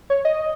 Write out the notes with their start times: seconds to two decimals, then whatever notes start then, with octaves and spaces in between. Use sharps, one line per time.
0.10 C#5
0.25 D#5